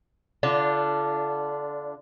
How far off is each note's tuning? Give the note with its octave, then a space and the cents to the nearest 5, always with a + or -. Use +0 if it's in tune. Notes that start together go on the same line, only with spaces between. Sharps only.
D3 -25 D4 +0 F4 -30